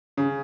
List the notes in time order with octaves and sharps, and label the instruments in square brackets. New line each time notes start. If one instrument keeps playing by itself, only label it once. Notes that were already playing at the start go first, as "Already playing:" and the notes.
[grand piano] C#3